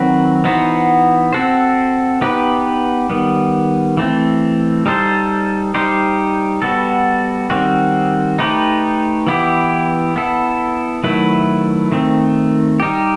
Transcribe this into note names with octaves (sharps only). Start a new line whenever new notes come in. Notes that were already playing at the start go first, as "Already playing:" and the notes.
Already playing: D#3 F#3 C4 F#4 B4
E3 B3 D#4 F#4 C5
C4 F#4 A4 C5
B3 D#4 G4 B4
D#3 G3 B3
E3 A3 C4
G3 D#4 A4 C5
G3 D#4 G4 C5
G3 B3 F#4 A4
D#3 G3 C4 F#4
A3 D#4 G4 B4
E3 B3 E4 G4
B3 E4 A4
D#3 F#3 A3 E4 B4
D#3 A3 C4
G3 D#4 G4